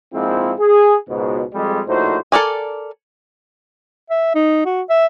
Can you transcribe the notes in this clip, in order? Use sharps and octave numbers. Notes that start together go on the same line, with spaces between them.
A#1 G#2 F3 G#3 C4 E4
G#4
C#2 G#2 B2
F2 G3 G#3
A#1 A2 D#4 F#4 C5
A4 A#4 D5 G#5
E5
D#4
F#4
E5